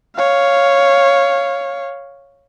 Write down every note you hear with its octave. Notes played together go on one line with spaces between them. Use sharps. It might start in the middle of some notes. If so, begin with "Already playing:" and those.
C#5 F5